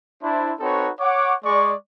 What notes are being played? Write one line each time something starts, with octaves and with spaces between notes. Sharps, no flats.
D4 E4 C5
C4 D#4 F#4 A4 B4 C#5
C#5 F#5 D6
G#3 D5 C#6